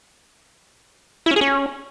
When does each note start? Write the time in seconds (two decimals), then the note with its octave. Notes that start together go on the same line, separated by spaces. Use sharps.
1.26 E4
1.31 C#4
1.36 G#4
1.41 C#4